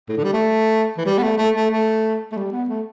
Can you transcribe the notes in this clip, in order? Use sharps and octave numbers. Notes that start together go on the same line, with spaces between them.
A2
D3
G3
A3
E3
G3
B3
A3
A3
A3
A3
A3
G3
B3
A3